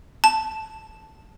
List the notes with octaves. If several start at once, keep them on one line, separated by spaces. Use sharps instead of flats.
A5